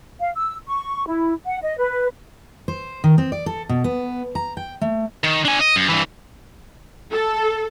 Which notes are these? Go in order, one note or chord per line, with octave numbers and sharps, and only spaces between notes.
F5
E6
C#6
E4
F#5
D#5
B4
C5
D#3
C4
D5
A4
B2
B3
A#5
G5
A3
D#3
D4 G#5
D#5
F#2
G2 E3
A4